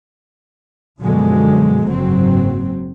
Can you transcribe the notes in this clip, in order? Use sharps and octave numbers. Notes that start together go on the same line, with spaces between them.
F#2 B2 D3 F3 F#3 G#3
F#1 G#2 F#3 C4